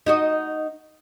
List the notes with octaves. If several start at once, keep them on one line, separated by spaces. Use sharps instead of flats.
D#4 F#4 D#5